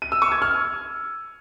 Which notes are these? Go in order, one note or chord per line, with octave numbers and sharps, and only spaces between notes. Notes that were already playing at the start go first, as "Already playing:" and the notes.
D#7
E6
C#6
G#6
F6